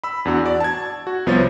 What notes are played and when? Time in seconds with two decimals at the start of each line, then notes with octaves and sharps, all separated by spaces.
0.04 B5 E6
0.25 E2 D4 F#4
0.45 F#4 D5
0.60 A5 G#6
1.07 F#4
1.26 C2 F3 B3 C5 C#5 A6